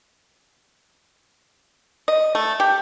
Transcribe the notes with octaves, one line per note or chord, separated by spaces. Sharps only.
D#5
A3
G4